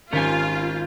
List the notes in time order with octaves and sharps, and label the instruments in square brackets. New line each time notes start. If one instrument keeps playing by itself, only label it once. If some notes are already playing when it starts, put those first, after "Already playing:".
[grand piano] G#1 [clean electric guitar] C#4 G4 G#5 [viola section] F4